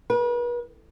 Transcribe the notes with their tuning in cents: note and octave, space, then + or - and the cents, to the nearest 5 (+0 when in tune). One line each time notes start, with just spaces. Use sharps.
B4 -40